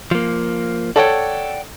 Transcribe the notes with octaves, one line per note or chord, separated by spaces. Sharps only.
F3 A#3
A4 C#5 D5 F#5 G5